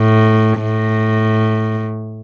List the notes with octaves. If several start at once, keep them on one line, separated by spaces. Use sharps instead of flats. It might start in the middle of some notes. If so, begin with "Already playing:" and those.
Already playing: A2
A2